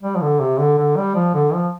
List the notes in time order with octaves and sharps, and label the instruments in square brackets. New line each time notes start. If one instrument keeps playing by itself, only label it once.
[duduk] G3
F3
D3
C3
D3
D3
G3
F3
D3
F3